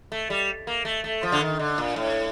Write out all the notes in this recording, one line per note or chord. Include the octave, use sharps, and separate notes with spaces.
A3
G3
A#3
A3
A3
F3
D3
D#3
D3
A#2
A2